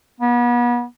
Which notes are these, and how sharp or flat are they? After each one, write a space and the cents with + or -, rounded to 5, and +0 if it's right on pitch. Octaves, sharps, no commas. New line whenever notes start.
B3 -35